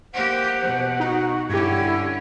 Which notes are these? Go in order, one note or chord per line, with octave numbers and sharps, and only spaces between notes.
A#3 G4 C5 F#5
B2
D#4 F#4
G2 D3 C#4 E4 G4 G#6